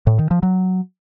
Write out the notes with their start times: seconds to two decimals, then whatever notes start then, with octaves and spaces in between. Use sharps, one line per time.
0.07 A2
0.19 D#3
0.31 F3
0.43 F#3